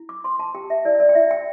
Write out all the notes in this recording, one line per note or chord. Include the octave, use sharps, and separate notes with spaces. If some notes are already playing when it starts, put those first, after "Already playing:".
Already playing: E4
D6
C5 C6
A5
G4 G5
E5
E4 D5
D5
G5
E4 E5
G5